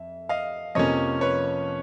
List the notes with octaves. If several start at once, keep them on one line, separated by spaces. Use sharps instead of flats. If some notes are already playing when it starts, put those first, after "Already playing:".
Already playing: F2 E5
D#5 F5
F2 C3 F3 A#3 C#4 C#5 D#5
B4 C#5